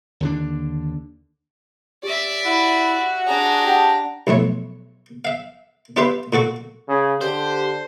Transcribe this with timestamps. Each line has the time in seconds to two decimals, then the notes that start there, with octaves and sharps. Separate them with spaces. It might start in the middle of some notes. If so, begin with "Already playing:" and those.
0.20 D#2 D3 D4
2.03 G4 D5 E5
2.45 E4 F#4
3.27 D4 G#4 A#5
3.66 G4 F#5 A5
4.27 B1 F2 A3 C#5
5.25 E5 F5
5.96 D4 F4 G4 B4 E5 C6
6.33 A#2 F#4 A4 C#6
6.88 C#3
7.21 D3 G4 C5